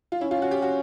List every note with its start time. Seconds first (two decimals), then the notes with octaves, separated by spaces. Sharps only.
0.12 F4
0.21 C#4 E4
0.31 F4
0.42 F#4
0.51 G4
0.62 F#4